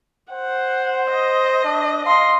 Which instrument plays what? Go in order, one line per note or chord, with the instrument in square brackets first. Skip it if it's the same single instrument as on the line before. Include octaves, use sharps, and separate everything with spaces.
[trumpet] C5 [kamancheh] F#5
[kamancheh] D#5
[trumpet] D4
[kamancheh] D#5 C6 [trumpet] F5